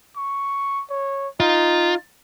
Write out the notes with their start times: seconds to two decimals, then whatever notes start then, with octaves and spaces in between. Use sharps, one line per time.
0.16 C#6
0.90 C#5
1.40 D#4 F4